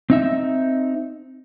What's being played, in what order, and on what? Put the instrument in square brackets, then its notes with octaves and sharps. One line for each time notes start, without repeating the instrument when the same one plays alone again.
[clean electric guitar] C4 D#4 E5